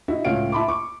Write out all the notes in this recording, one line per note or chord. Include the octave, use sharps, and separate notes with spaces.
D#4 E4 F#4 E5
C#2 A2 C#4 F5 D7
E4 A5 B5 C6 D6
C#6 D6